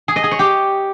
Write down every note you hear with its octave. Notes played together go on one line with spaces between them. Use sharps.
G#4
D#5
G#4
C#5
G4